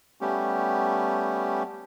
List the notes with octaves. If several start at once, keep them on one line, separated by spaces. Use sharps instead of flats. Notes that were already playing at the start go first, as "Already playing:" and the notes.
G3 A3 B3 C#4 G4